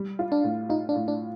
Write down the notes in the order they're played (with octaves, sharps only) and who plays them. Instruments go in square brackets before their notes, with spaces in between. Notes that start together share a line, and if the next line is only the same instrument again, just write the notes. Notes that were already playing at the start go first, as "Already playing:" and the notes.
Already playing: [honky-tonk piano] G3
F4
[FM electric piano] D4
[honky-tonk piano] A2
[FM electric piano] D#4 [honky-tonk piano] F4
[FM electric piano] D4
[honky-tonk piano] A2
[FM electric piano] D4